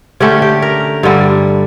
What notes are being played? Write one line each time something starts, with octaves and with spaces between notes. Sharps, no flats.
D3 A3 C#4 G4
G4
A#4
G2 D3 G3